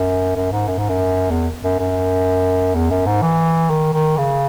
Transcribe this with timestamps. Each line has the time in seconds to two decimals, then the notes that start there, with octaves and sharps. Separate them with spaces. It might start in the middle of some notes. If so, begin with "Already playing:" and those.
Already playing: F#2
0.36 F#2
0.52 G#2
0.68 F#2
0.78 G#2
0.89 F#2
1.31 E2
1.63 F#2
1.79 F#2
2.75 E2
2.90 F#2
3.06 G#2
3.22 E3
3.70 D#3
3.94 D#3
4.18 C#3